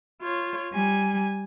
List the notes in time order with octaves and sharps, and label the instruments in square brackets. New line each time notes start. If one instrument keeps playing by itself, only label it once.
[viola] F4 C#5
[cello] G3 [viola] G#5